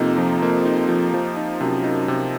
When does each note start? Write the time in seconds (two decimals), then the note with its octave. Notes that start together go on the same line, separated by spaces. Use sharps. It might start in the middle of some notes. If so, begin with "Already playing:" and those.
Already playing: F2 C3 A#3 D#4
0.18 F3
0.42 A#3
0.66 D#4
0.89 F3
1.14 F3
1.37 D#4
1.60 F#2 C3
1.84 D#4
2.08 C3